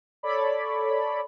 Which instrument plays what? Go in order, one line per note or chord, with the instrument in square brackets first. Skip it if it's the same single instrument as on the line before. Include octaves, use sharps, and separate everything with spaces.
[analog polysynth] A4 C#5 D5 B5